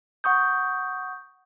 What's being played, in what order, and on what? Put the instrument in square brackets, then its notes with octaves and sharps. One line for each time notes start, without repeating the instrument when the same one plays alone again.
[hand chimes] F#5 C#6 D#6 G6